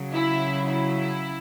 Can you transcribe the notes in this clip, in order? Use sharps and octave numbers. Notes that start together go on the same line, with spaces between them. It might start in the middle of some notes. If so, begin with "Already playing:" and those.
Already playing: C#3 F#3
E4
E4